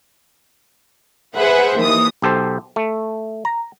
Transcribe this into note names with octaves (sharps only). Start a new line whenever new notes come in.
G#4 B4 C5 E5 F#5
D#2 E3 D#6
B1 G4 A4 C5
A3
A#5